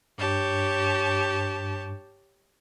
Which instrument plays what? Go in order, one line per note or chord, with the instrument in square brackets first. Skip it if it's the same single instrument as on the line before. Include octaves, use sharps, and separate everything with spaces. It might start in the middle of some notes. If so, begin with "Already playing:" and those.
[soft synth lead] G2 [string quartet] G4 C#5 A5